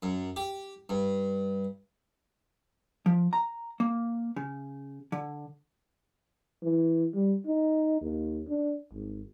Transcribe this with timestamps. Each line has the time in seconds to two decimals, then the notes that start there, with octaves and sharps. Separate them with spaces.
0.03 F#2
0.36 G4
0.89 G2
3.06 F3
3.33 A#5
3.80 A#3
4.36 C#3
5.12 D3
6.63 E3
7.14 G3
7.46 D#4
8.02 D#2
8.48 D4
8.93 G#1